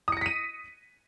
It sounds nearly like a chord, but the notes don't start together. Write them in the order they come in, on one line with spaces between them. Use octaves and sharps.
D#6 C#7 A#6 B6 D#7